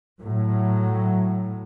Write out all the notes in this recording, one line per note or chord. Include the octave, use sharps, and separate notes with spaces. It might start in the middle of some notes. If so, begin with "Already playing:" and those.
A2 F#3